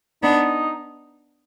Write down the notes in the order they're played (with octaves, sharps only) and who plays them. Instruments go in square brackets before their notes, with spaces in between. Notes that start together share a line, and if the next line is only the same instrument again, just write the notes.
[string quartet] B3 D4 [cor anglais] D#4